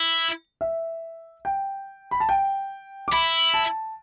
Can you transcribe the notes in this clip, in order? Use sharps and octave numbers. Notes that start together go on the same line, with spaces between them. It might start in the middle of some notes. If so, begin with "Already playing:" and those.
Already playing: E4
E5
G5
B5
A5
G5
D6
E4 B5
A5